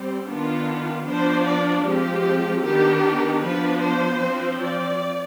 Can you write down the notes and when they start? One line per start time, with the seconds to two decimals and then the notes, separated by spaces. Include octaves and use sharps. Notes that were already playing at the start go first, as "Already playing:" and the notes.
Already playing: G3 C4
0.27 D#3 B3 D4 F4
1.06 F3 B3 D4 C5
1.45 D5
1.85 F3 G#3 C4 G4
2.64 D#3 B3 D4 G4
3.42 F3 B3 D4 B4
3.82 C5
4.21 F3 C4
4.61 D5